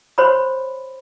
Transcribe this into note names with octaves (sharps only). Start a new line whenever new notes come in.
C5 C#5 B5 C6